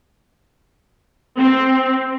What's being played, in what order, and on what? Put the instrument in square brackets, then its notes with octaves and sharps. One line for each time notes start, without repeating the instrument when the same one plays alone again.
[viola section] C4